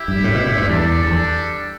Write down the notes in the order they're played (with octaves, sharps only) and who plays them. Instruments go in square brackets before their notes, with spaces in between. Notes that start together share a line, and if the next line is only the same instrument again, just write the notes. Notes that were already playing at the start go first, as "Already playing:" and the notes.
Already playing: [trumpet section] E4 G4 E5
[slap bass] G2
A2
B2
A2
G2
[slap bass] E2 [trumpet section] G3 D4 A4 D5
[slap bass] E2